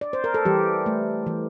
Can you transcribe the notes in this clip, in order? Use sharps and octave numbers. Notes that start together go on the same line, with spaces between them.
D5
C5
A#4
A4
E3 G3 G4
A3
E3